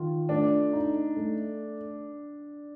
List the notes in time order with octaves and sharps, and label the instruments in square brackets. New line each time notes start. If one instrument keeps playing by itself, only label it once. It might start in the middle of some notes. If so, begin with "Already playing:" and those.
Already playing: [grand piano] D#3 F4
[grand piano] A3 [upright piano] D4
[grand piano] D#4
A3